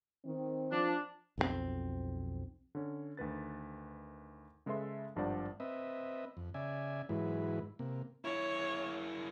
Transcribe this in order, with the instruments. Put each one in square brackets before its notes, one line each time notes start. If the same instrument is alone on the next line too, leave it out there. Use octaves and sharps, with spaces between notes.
[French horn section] D#3 [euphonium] C4
[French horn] F3 [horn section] D4
[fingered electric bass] B1 F2 F#3 C4
[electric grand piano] D3 C#4
D2 D#3 B4 A6
C#3 G#3 A4 B4 E5 C6
G#1 G2 F3 C5 D5 F#5
[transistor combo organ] C4 B4 D#5 E5
F2
C#3 D5 E5 G#5
G#2 E3 F#3 G#3 E4 B4
C3 A#3
[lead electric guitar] F#2 E4 [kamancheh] C#5